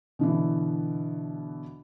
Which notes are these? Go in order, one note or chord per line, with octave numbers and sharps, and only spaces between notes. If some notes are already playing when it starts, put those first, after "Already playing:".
B2 D3 E3